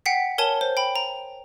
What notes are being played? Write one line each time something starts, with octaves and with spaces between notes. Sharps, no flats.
F#5 G5 B6 C7
A#4 C#5 G#5 A5 G7
C5
G5 B5
A#5